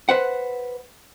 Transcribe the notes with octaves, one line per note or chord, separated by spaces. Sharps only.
B4 C5 F#5